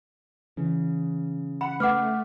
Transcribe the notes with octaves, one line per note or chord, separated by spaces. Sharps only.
C#3 E3
F#5 B5
A3 B4 F#5 D6 F6